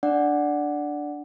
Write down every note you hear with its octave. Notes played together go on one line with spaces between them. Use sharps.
D4 D5 F#5